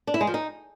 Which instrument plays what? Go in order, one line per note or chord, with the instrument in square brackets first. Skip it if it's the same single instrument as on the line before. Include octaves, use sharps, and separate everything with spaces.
[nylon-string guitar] D4
E4
G#3
F3
D#4